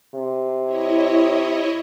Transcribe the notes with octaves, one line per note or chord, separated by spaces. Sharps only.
C3
E4 C#5 D#5